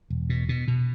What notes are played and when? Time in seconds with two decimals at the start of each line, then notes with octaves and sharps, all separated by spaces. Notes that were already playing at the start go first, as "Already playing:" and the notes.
0.10 E1
0.30 B2
0.49 B2
0.68 B2